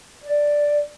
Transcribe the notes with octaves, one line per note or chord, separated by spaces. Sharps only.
D5